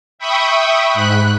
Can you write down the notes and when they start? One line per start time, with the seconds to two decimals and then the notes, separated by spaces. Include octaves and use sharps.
0.19 E5 G5 B5 C#6 D#6
0.90 G#2 B5 F#6